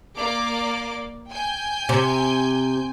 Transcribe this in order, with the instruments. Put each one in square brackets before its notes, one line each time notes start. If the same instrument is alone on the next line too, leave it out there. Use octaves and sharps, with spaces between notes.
[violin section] A#3 D5 D6
G5 G#5 G6
[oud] C3